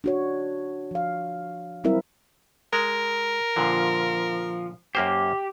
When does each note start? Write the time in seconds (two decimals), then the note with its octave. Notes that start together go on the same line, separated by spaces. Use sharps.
0.04 D4 F#4 C#5
0.91 F3 F5
1.84 F#3 G3 C4 E4 A#4 E5
2.73 G#3 A#4
3.56 A#2 D3 F3
4.95 F#2 A#3 G4 C5